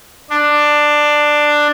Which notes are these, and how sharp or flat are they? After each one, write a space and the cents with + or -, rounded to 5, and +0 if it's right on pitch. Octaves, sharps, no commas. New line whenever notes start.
D4 +10